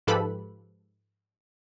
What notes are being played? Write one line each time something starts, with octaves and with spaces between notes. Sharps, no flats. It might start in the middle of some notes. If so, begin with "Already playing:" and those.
G#2 F3 G4 A4 B4 B5